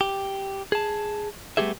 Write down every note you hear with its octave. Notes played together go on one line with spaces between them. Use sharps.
G4
G#4 A5
G3 A3 B3 G4 G#4 E5